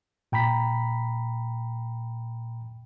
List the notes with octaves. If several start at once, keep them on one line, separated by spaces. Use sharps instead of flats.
A#2 G5 A#5 B5 B6